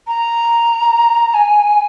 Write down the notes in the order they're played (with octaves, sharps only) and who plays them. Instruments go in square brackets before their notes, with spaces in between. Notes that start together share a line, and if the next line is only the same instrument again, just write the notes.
[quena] A#5
G#5